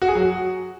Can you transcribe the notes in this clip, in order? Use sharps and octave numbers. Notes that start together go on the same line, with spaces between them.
F#4
G#4
F#3
F#4